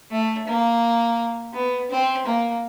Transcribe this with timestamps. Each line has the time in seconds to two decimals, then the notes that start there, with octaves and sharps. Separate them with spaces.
0.11 A3
0.47 A#3
1.54 B3
1.90 C4
2.26 A#3